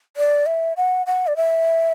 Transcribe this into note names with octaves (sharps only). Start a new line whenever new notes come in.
D5
E5
F#5
F#5
D5
E5